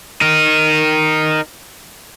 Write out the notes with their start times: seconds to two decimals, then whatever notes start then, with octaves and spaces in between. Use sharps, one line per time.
0.21 D#4 A#4